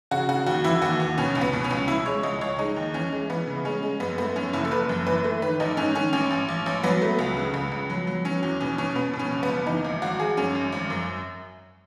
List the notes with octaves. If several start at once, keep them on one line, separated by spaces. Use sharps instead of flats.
C#3 F#4
C#3 F#4
D#2 F#4
E3 E4
D#2 F#4
D#2
B2 C#4
C#2
B3
B2
C#4
C#2
B2 E4
G#3 C#5
C#2 D#5
C#2 C#5
G#3 D#4
D#2
E3 C#4
G#3
E3 B3
C#3
G#3 C#4
G#3
F#2 B3
A3 B3
F#2 C#4
F#1 E4
A4
F#1 B4
F#2
E3 B4
A3
D#3 B4
A1 D#4
G#2 C#4
D#3 C#4
A1 C#4
A1
A1
A1
F#3 B3
A3
C#2
C#3
C#2
C#2
F#3
F#3
F#3 C#4
E2 C#4
B2 C#4
B2 C#4
B2 B3
B2
C#4
F#1
B3
F#1
E3 D#4
G#1
G#1 F#4
G#1 G#4
F#2 C#4
G#1
G#1
F#2